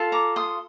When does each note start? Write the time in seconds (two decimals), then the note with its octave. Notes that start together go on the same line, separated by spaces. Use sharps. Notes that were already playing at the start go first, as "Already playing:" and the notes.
Already playing: F4 A4
0.12 A#5 D6
0.36 C6 D#6